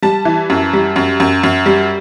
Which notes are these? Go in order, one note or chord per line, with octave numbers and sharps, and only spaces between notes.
G3 A5
E3
F#2
G3
F#2
F#2
F#2
G3